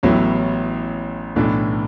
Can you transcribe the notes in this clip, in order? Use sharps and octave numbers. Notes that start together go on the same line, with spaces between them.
A1 A2 F#3 B3 E4
B1 A2 E3 B3 D4